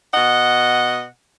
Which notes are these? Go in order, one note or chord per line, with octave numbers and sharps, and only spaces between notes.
B2 D#5 F#5